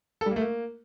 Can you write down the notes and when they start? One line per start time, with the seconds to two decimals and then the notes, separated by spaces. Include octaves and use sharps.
0.21 A4
0.26 G3
0.31 A#3
0.36 A3
0.41 A#3